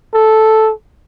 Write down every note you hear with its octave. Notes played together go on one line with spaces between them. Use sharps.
A4